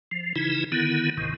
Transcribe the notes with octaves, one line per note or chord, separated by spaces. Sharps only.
F3
C#3 E3 D#4 E4
D3 D#3 B3 E4
G#1 C#2 G#2 C3 D#3